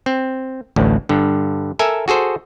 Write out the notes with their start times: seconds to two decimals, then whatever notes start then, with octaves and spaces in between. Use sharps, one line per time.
0.06 C4
0.76 A1 D2 A2
1.09 G2 D3
1.79 A4 A#4 E5 G#5
2.08 F#4 G#4 A4 C5